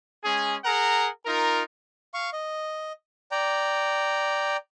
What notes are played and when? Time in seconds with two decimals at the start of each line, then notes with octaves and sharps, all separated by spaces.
0.24 G#3 C#4 G#4
0.65 G#4 A#4 F#5 A#5
1.26 D#4 F4 A#4
2.14 F5 C#6
2.33 D#5
3.31 D5 G5 A#5